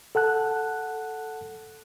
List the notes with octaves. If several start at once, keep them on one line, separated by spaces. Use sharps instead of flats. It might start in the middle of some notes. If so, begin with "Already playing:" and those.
A4 F#5 A5 F#6